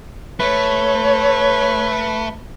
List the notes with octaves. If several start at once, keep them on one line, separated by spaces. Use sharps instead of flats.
A3 B4 C#5